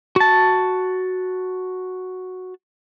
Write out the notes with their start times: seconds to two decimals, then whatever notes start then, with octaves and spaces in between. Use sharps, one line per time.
0.16 F#4 A5